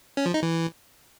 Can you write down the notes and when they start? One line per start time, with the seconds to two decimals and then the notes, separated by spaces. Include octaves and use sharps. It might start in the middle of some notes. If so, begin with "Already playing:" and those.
0.17 C#4
0.26 F3
0.34 D#4
0.43 E3